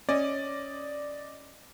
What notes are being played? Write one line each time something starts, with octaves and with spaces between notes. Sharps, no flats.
C#4 D5 D#5